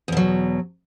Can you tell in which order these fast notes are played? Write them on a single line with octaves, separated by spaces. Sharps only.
E2 B2 F#3